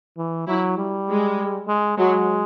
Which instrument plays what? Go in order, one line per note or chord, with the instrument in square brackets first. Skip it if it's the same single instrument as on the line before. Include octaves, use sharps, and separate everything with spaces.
[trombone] E3
[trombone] F#3 [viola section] E4
[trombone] G3
[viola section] G#3
[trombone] G#3
[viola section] F#3 [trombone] G#3